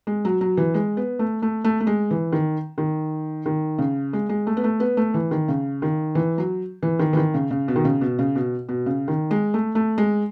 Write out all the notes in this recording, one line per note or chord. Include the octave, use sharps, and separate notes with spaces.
G#3
F#3
F#3
E3
G#3
B3
A3
A3
A3
A3
G#3
E3
D#3
D#3
D#3
C#3
G#3
G#3
A3
B3
A3
B3
A3
E3
D#3
C#3
D#3
E3
F#3
E3
D#3
E3
D#3
C#3
C#3
B2
D#3
C#3
B2
C#3
B2
B2
C#3
D#3
G#3
A3
A3
G#3